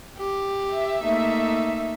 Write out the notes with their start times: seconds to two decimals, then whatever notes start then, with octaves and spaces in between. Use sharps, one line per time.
0.18 G4
0.72 E5
1.03 A3 A#3 D#4